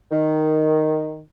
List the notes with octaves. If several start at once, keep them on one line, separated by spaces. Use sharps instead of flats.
D#3